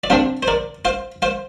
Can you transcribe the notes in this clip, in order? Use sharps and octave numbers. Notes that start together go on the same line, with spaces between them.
D5
C3 G3 D4 C5 F5
C5
A#4 D5
C5 F5
C5 F5